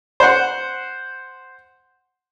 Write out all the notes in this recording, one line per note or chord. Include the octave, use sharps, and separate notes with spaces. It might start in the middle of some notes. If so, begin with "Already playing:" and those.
C5 F#5